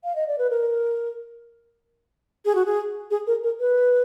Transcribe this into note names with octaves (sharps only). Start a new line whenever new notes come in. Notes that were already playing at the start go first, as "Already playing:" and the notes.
F5
D#5
D5
B4
A#4
G#4
F#4
G#4
G#4
A#4
A#4
B4